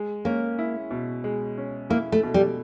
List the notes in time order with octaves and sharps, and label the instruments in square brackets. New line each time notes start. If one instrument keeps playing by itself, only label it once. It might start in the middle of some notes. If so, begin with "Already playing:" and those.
Already playing: [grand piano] G#3
[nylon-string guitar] A#3 [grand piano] C#4
[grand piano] E4
B2
G#3
C#4
[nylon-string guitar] A#3 [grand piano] E4
[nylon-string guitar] A3
[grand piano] B2
[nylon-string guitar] G3